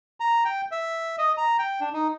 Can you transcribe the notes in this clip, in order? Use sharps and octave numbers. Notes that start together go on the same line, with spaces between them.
A#5
G5
E5
D#5
A#5
G5
D4
D#4